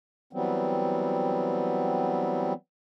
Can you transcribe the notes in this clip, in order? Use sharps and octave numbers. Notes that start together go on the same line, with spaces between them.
E3 F#3 G3 B3 C4